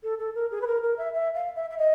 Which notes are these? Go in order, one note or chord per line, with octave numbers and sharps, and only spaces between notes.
A4
A4
A#4
G#4
B4
A#4
A#4
E5
E5
F5
E5
E5
D#5